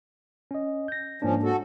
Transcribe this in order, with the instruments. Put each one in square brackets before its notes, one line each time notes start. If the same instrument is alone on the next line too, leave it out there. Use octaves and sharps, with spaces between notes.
[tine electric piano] C#4 D#5
G6 A#6
[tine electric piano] G#2 A#3 D4 [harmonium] F3 C#4
[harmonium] F#4 A4